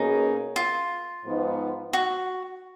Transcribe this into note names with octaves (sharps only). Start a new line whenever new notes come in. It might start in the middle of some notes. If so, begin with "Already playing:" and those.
Already playing: B2 A#3 C#4 D#4 G#4
F4
G#2 F3 B3 D#4
F#4